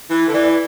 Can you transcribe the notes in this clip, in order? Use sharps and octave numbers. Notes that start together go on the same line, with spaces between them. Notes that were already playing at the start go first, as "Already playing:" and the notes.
E3
D3
E3 D5